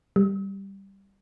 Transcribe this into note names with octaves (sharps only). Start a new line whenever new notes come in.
G3